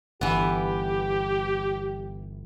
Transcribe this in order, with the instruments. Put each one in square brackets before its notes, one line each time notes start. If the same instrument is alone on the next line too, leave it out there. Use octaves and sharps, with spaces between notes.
[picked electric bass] G1 [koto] E3 B3 [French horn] G4